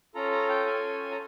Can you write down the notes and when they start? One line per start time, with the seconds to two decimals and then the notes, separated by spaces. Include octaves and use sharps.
0.15 C#4 F4 A4 A#5
0.31 A#5
0.49 G5
0.66 G#5
1.11 A#5